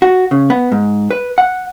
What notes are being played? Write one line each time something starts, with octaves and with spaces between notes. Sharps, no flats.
F#4
C#3
B3
G#2
B4
F#5